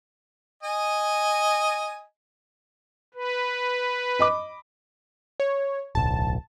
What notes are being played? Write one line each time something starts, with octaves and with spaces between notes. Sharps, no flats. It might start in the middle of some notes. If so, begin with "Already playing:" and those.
D#5 G#5
B4
D#5 B5 D6
C#5
D1 B1 A5